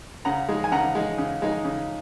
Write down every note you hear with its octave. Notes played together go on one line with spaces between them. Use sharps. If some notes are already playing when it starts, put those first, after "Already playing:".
C#3 F#5 A#5
G#3 D#4
G#5
C#3 F#5 A#5
G#3 D#4
C#3
G#3 D#4
C#3